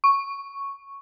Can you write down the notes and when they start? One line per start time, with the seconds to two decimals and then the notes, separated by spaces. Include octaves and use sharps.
0.04 C#6